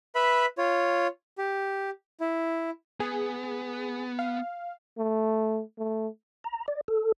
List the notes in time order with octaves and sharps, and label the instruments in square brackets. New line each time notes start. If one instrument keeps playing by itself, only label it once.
[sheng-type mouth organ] B4 E5 B5
F4 C#5
G4
E4
[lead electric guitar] B3 [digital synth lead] G#4
[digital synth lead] F5
[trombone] A3
A3
[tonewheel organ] A#5
D5
A4